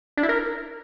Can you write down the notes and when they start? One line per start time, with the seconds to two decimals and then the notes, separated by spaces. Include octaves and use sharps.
0.17 D4
0.23 E4
0.29 A#4